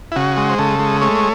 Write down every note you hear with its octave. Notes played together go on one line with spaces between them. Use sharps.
E4
C#3 F#4
G#3
C5
C#3 A4
G#3
A3 C#5